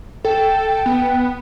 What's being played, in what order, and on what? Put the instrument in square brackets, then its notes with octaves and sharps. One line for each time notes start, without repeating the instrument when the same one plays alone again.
[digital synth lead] A4 [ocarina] G5
[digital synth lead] B3